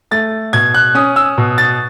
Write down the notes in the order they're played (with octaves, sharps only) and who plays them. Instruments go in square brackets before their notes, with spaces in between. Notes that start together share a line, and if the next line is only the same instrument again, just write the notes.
[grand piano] A3 A6
B2 G#6
F#6
C#4 D#6
E6
B2
A6